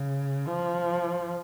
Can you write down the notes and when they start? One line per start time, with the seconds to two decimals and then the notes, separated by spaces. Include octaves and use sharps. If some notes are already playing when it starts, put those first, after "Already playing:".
Already playing: C#3
0.47 F3